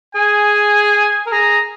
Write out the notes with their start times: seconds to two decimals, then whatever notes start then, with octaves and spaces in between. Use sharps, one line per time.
0.15 G#4 G#5
1.26 A#4
1.32 G#4 A#5